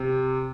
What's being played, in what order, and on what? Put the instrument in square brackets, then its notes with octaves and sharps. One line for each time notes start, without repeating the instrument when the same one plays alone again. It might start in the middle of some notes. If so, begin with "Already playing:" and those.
Already playing: [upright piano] C3